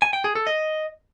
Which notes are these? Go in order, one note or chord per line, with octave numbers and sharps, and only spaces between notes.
G#5
G5
G#4
A4
D#5